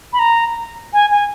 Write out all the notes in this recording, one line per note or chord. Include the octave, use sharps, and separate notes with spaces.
B5
A#5
G#5
G#5